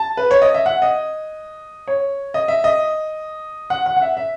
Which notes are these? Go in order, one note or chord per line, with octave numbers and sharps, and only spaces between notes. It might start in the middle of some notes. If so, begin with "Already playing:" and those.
Already playing: A5
B4
C#5
D#5
E5
F#5
D#5
C#5
D#5
E5
D#5
F#5
F#5
F#5
E5
E5